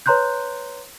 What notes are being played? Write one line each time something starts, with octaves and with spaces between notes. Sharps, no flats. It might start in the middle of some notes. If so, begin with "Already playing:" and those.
B4 C#5 A#5 C6 F#6 G6